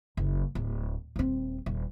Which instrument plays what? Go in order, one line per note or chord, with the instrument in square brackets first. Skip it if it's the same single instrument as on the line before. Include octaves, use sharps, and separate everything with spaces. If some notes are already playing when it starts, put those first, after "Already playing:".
[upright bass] F#1
D1
D#1 C4
D#1